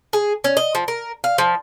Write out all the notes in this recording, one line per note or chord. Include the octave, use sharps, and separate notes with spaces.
G#4
C#4
D#5
F3
A#4
F5
F3